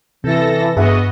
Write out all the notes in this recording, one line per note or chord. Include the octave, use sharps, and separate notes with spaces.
C3 E3 A4 A#6
G2 B3 F#4 G#4 D#5 E5 F#5